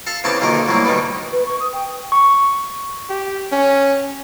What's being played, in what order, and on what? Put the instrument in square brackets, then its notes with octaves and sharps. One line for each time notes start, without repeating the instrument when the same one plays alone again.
[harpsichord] A4 F5 A5
E2 C#3 C4 G4 A5 C#6
B1 A#2 D3 D#3 D#4 A#4
C2 A2 F#3 A#3
D2 B2 D#3 G3 B3
[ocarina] B4
C#6
D#6
G5
[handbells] C#6
[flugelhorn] G4
C#4